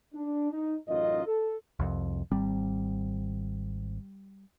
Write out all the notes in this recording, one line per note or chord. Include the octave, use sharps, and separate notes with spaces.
D4
D#4
A1 F#2 D#4 F4 D#5
A4
C2 F2
G#1 G3 C4